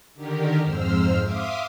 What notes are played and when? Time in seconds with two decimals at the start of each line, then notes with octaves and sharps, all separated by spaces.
0.15 D3 D#3 G4 A#4
0.63 F2 G#2 C5 E6 F6
1.21 E5 F5 C6 D6 D#6